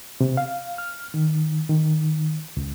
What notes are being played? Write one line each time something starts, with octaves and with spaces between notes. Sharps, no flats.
C3
F5
F6
D#3
D#3
C#2